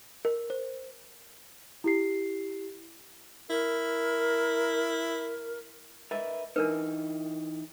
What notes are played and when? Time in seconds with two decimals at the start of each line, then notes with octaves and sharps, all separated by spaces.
0.25 A#4
0.50 C5
1.84 E4 G4 C7
3.50 E4 A#4
6.11 A#4 B4 D#5 E5
6.56 E3 D4 D#4 A#4 B4